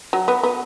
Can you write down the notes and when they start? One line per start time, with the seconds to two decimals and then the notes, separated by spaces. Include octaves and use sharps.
0.13 F#3
0.28 B3
0.43 B3